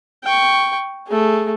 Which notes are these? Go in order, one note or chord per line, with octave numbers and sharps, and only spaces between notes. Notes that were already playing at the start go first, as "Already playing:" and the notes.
G5 C#6
A3 G#4